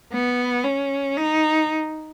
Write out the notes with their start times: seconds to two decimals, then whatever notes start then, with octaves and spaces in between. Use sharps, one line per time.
0.13 B3
0.64 C#4
1.17 D#4